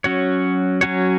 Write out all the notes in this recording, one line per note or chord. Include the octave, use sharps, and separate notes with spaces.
F#3 C#4 F#4 C#5
F#3 C#4 F#4 C#5